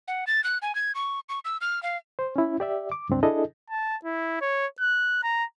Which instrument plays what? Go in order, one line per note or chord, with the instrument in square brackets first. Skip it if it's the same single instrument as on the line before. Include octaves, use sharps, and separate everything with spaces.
[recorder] F#5
A6
F#6
G#5
G#6
C#6
C#6
E6
F6
F5
[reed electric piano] C5
C#4 E4
G4 D5 E5
D6
C#2 G2 C4 D4
D4 E4 G#4 A4 D#5
[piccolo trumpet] A5
E4
C#5
F#6
A#5